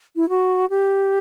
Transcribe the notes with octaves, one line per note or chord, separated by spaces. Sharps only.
E4
F#4
G4